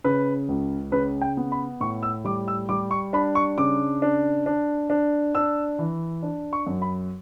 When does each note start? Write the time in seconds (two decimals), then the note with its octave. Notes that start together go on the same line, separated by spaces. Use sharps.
0.04 C#3 B4
0.49 C#2
0.92 C#3 B4
1.21 G5
1.37 B3
1.52 B5
1.81 A2 C#6
2.03 E6
2.25 G3 D6
2.48 E6
2.69 G3 D6
2.91 C#6
3.13 D4 B5
3.35 C#6
3.58 C#3 D6
4.02 D4
4.46 D4
4.90 D4
5.35 D4 E6
5.79 E3
6.23 D4
6.53 C#6
6.67 F#2
6.82 B5